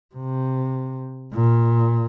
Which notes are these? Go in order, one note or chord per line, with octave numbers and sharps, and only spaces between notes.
C3
A#2